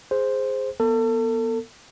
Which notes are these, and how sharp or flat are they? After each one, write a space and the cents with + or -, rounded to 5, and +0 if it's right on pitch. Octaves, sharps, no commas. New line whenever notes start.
G#4 -5 C5 +0
B3 -25 A4 +35